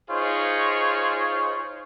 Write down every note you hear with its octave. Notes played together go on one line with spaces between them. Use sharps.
D#4 F4 G#4 C5 C#5